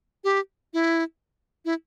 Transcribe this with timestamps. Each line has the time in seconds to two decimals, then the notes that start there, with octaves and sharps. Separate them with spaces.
0.24 G4
0.74 E4
1.65 E4